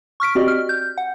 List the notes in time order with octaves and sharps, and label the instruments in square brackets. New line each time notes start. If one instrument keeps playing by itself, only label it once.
[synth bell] C#6 F6 B6 D7
C4 F#4 G4 D5 D#5
F6
G6
F#5